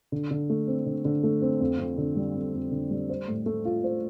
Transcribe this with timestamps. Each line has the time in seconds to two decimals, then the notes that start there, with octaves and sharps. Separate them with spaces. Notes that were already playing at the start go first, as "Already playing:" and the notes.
0.12 D3
0.31 D3
0.50 A3
0.67 C4
0.86 D3
1.05 D3
1.23 A3
1.42 C4
1.60 F2
1.79 F2
1.98 D3
2.16 G3
2.35 F2
2.54 F2
2.72 D3
2.91 G3
3.09 C5
3.28 A2
3.46 A3
3.65 F4
3.84 C5